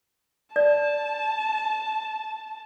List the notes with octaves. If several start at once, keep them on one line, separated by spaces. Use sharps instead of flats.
D5 A5